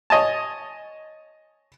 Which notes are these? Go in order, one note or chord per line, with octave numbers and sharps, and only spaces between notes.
C#5 D#5 G#5 A5